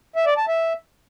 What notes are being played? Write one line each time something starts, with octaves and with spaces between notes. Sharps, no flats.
E5
D5
A5
E5